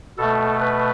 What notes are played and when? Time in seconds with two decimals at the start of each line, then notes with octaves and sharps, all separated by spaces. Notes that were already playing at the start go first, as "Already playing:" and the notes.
0.18 B2 A3 A4
0.61 B4